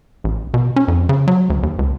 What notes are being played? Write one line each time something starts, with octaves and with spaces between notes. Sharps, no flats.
A1
B2
C#4
F2
C#3
F#3
D2
D#2
C#2